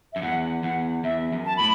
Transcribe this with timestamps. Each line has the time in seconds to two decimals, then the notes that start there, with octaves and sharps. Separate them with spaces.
0.13 F#2 E5
0.22 E2 F#5
0.63 E2 F#5
1.04 E2 E5
1.32 F#2
1.45 A5
1.57 A2 B5